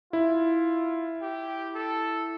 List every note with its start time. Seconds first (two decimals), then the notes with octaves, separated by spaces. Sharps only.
0.13 E4 F4
1.21 G4
1.75 A4